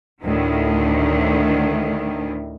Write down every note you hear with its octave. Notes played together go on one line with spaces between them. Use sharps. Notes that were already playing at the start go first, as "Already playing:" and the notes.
D2 A2 D#3